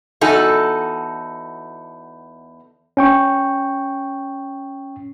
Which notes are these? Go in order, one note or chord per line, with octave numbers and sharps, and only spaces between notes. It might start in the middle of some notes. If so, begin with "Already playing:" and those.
E2 D#4 F#4 A4 G#5
C#4 G5 C#6